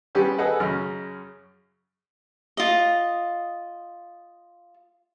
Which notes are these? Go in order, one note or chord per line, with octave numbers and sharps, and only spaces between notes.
G3 B3 C#4 G4 G#4 C5
G#4 A4 B4 D#5 F#5
F#2 C#3 F6
F4 D#5